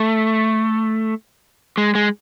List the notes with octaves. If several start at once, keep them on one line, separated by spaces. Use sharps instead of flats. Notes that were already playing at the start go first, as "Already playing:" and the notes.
Already playing: A3
G#3
G#3